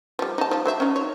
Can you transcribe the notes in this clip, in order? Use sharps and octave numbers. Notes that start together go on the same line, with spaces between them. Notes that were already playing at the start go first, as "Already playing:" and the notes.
F3 G3
D#4 A5
F3
F#3 C5 E5
C#4 D#4
C#5